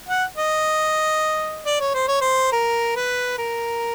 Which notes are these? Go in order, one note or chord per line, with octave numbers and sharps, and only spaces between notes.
F#5
D#5
D5
C#5
C5
C#5
C5
A#4
B4
A#4